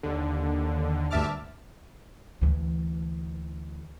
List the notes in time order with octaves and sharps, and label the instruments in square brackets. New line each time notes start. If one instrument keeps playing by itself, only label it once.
[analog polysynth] D#2 D3
D2 G2 E5 A5 D6 F6
[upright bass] D2 E3